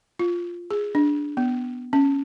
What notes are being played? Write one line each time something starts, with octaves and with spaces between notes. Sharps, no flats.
F4
G#4
D4
B3
C#4